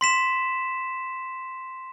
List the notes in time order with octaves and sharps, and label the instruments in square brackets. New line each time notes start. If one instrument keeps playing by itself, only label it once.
[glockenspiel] C6 B6 E7